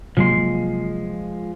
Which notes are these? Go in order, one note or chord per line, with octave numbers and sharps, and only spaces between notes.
C3 F3 F#3 G#3 A#3 C6